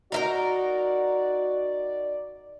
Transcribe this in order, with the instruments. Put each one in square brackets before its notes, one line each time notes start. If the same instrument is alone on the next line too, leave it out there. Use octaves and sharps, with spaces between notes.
[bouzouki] D#4 E4 A#4 [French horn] F#4 [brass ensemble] D5